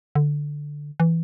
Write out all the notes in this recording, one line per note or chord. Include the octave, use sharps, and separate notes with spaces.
D3
E3